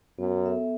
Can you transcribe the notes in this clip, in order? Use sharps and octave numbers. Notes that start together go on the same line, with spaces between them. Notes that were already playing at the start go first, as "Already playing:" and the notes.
F#2 B3
A4 E5